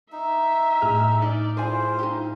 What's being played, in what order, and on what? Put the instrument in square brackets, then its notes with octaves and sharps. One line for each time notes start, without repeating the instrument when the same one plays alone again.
[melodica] D#4 [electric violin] E5
[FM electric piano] A2 F6 [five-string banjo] G#4
[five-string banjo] D#4 [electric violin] D5
[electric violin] E4 F4 [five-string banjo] G#4 G#5 [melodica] C5
[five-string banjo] D#4 G4